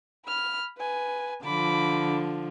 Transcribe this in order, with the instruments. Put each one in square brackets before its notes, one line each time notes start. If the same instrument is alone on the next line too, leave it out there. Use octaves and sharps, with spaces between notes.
[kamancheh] B5 F6
B4 G#5
[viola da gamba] D3 F3 [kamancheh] B5 D6